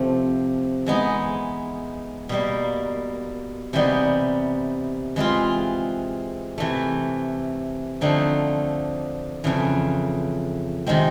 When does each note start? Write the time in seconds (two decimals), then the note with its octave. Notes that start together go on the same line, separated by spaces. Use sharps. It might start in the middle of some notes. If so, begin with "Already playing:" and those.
Already playing: C3 F3 A3 C4
0.86 E3 G#3 B3 D#4
2.29 B2 G3 A#3
3.73 C3 E3 G3 B3 D#4
5.16 E3 G#3 C4 F4
6.58 C3 E3 A3
8.01 D3 F3 A3 C4 D#4
9.44 F2 C#3 E3
10.86 C3 D#3 G#3 C4